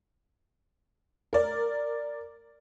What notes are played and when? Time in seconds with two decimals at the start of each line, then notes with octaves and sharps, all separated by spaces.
1.33 A#4 D5